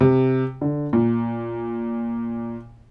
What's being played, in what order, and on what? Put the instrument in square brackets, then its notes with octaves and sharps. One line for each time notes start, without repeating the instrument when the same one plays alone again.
[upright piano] C3
D3
A#2